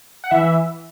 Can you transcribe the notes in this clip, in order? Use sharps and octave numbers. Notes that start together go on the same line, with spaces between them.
F#5
E3 E5